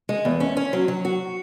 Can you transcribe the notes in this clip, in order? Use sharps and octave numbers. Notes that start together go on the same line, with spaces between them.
G#3
E2
C#4
C#4
F#3
F#3
F#4